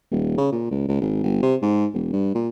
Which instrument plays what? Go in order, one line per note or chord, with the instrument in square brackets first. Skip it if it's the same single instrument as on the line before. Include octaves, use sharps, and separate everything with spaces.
[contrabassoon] D#1
C#3
A#2
C#2
C#2
G#1
G1
C3
G#2
E1
G2
A#2